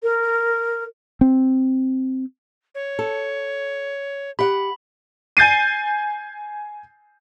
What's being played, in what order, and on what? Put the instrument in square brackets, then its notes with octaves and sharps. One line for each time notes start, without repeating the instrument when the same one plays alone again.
[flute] A#4
[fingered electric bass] C4
[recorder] C#5
[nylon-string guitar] A4
[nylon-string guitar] G4 F#5 [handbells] B5
[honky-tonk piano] G#5 G6 A6 C7 D#7